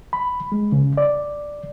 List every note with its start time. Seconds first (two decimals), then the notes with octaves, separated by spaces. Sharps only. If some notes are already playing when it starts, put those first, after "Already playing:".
0.13 B5
0.52 G#3
0.72 C#3
0.97 D5